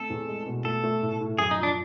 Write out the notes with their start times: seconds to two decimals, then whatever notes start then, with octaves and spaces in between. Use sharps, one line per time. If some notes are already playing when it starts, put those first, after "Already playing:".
Already playing: A3 C4 A4
0.10 E2
0.28 G#3
0.47 B2
0.65 A3 A4
0.84 A3
1.02 A2
1.21 A2
1.39 F#2 G#4
1.51 D#4
1.58 F3
1.63 D4